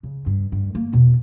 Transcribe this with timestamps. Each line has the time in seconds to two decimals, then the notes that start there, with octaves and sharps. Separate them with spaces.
0.03 C#3
0.26 G2
0.52 G2
0.74 A3 A#3
0.93 E2 B2